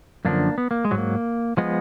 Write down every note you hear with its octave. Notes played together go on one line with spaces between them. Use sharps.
F#2 D3 F3 A#3 D4
B3
A#3
G#3
G#2 F#3
A#3
F3 G#3 B3